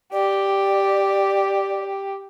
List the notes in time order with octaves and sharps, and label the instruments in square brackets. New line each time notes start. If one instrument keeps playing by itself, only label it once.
[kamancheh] G4 [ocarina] D5